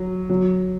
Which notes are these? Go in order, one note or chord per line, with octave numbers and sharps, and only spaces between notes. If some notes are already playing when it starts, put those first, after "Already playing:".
Already playing: F#3
F#3